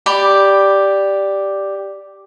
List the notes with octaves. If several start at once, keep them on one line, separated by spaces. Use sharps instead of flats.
G4 D5 B5